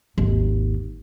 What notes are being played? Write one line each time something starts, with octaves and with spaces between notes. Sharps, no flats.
G#1 D#2